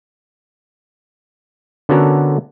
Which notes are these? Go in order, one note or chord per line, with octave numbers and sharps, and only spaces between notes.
D3 B3 C#4 F#4 A4 A#4